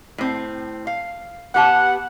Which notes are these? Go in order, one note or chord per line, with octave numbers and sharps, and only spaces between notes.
A2 C4
F5
B3 G4 F#5 A5